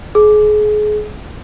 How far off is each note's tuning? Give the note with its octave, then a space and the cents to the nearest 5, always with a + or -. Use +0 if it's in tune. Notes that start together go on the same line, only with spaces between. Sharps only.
G#4 +30